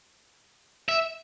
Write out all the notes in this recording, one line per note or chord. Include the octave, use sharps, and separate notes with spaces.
E5